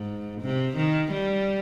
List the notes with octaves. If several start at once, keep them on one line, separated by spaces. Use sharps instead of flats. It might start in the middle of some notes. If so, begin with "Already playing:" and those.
Already playing: G#2
C3
D#3
G3